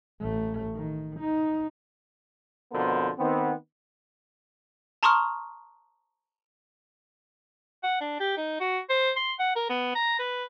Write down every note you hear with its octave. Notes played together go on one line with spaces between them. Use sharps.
A1 A3
D#3
D#4
F2 B2 D3 B3 A#4 C5
D#3 B3 C4
A5 A#5 C6 C#6 D#6 F6
F#5
D4
G4
D#4
F#4
C5
C6
F#5
A#4
B3
A#5
B4